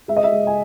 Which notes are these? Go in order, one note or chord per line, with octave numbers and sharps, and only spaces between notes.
G#3 E5
D#5
E5
G#3
G#5